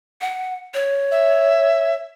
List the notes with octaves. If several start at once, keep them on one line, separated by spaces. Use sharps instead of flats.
F#5
C#5
E5